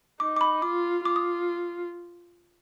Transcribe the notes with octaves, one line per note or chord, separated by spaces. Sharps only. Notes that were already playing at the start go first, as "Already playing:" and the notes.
D#4 D6
D6
B5
F4 D6
F4 D6
D#6